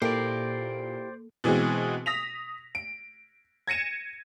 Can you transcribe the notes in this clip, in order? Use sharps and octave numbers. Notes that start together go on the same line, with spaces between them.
A#2 A#3 E4 G4 A4 A#4 C5 D5
B2 E3 G#3 C4 F#4 G#4
D#6 A#6 B6 F7
D7
G#6 A#6 C#7 D#7 E7